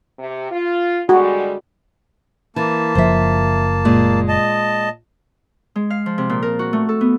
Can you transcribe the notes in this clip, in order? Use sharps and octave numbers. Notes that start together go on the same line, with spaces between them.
C3
F4
D3 G3 G#3 F#4
E3 A#3 A5
F#1 F3 C5 E5
A#2 G#3
D#5 A5
G#3
F5
F3
C3
A#2
A#4
F#4
A3
A4
B3